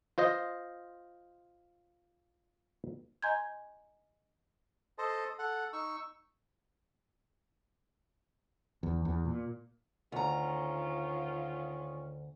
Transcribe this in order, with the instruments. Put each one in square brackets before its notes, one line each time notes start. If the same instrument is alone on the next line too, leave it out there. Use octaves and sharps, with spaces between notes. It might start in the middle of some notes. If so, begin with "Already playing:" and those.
[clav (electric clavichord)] F4 C5 D#5
[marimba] D#5 G#5 A#5 C6 G6 G#6
[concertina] A4 C5 D#5 A5
A4 F#5
D#4 C#6 E6
[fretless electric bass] E2
E2
A#2
[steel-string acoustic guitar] D2 A#5 [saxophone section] D#3 C#4 F4